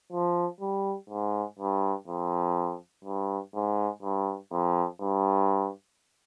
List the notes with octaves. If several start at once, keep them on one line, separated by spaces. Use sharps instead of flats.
F3
G3
G#2
G2
F2
G2
G#2
G2
F2
G2